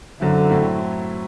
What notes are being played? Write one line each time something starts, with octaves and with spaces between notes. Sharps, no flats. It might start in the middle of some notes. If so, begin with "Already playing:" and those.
F#2 D3 F#3 C4 E4
A2 F#3 C4 E4